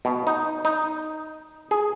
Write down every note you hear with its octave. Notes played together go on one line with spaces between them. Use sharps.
B2
D#4
D#4
G#4